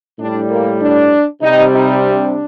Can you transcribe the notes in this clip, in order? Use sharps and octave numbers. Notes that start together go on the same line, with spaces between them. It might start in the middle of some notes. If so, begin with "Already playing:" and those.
A2 G3 D4
A#3
D4
C3 G3 D#4
D#4
D4